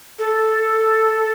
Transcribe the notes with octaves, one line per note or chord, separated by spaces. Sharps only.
A4